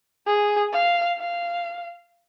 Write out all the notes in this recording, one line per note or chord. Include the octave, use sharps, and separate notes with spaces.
G#4
F5
F5